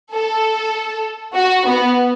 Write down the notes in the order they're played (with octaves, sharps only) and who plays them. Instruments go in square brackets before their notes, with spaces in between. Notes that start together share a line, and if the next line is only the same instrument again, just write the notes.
[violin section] A4
F#4
B3